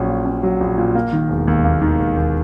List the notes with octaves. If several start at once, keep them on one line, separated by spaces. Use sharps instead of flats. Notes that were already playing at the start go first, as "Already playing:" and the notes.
Already playing: A#1 F#3 C#4
A#2
C#4
F#3
A#1
A#2
A#3
D#3
E1
D#2
A#3
D#3
E1
D#2